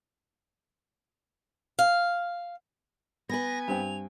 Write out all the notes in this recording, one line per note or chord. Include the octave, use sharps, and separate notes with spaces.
F5
B3 B4 G#5 A#6
G2 C4 G5 F7